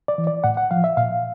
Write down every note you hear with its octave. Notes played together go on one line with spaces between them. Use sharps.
D5
E3
D5
A2 F#5
F#5
F3 F5
E5
A#2 F5